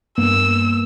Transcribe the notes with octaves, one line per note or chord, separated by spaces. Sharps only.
G2 A#3 B3 E6